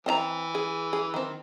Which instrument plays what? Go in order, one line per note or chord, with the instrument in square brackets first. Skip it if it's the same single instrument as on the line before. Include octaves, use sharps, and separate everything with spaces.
[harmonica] E3 [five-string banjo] C4 D#5 A#5
[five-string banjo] G#4
G#4
D#3 C4